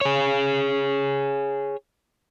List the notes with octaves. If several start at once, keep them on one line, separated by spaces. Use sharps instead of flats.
G#4 C#5